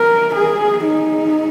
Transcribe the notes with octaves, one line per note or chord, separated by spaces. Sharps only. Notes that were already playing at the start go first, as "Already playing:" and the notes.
Already playing: A#4
G#4
D#4